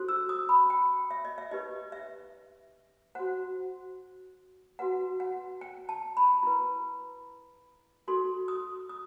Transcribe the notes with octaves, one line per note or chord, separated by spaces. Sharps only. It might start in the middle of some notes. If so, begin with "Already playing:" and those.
Already playing: F#4 A4 C5
E6
D#6
B5
G5
E5
D#5
E5
D#4 G4 B4 D#5
E5
F#4 C5 F#5
F#4 B4 F#5
F#5
G5
A5
B5
E4 B4
D#4 F#4 A4 C6
D#6
D#6